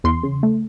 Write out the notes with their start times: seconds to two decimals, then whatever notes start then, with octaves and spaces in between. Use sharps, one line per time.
0.04 E2 C6
0.23 C#3
0.43 A3